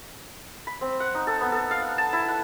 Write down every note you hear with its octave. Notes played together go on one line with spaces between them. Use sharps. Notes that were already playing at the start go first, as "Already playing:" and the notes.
B5
C4
F#5
D#4
A4
B3
A4
F5
F#5
A5
E4
F#5